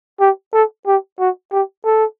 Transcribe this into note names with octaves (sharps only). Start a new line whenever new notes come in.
G4
A4
G4
F#4
G4
A4